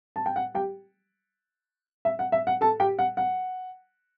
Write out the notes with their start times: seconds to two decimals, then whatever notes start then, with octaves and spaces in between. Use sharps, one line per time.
0.16 A5
0.26 G5
0.36 F#5
0.55 G4 G5
2.05 E5
2.19 F#5
2.32 E5
2.47 F#5
2.61 A4 A5
2.80 G4 G5
2.99 F#5
3.17 F#5